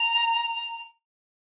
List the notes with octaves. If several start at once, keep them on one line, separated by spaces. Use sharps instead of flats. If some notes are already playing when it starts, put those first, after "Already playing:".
Already playing: A#5